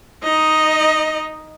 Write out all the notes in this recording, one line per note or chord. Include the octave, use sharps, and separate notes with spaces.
D#4 D#5